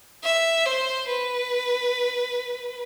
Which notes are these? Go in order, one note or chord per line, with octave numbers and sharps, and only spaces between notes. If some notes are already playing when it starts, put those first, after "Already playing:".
E5
C5
B4